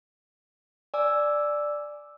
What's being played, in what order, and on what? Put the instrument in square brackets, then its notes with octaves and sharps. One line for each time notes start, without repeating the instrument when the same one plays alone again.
[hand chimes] D5 G#5 D6 E6